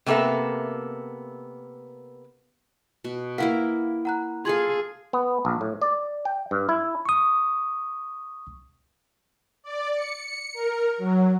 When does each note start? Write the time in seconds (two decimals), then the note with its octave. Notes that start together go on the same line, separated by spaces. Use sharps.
0.06 C3 A#3 B3 A4 E5
3.04 B2
3.38 A#3 E4 A#4 F5 F#5 B6
4.05 F#5 A#5 F#6
4.45 F4 G#4 A4 F5 C6 G#6 F#7
5.13 B3
5.45 A#1
5.61 A2
5.82 D5
6.25 G5
6.51 G2
6.69 E4
7.06 C#6 D#6
9.62 D5
9.94 C#7
10.53 A#4
10.98 F#3